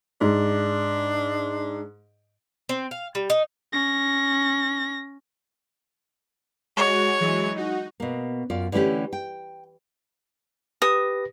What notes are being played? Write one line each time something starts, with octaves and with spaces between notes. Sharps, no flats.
G#2 D4
C4
F5
G3
D#4
C#4 A#6
G#3 F#4 C#5
E3 F#3 G#3
D#4 F#4
B2 A#3
F#2 F4 D5
D3 E3 A3 C#4 G4
G5
G4 B4 D#6 A#6